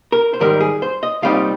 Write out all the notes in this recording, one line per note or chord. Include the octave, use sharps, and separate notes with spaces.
A#4
C5
G#2 D#3 G3 A#4
G#4
C5
D#5
C2 A#2 G3 C4 D#4 F5